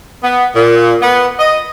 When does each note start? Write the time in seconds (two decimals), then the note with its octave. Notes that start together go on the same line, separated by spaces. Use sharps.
0.24 B3
0.55 A#2
1.02 B3
1.39 D#5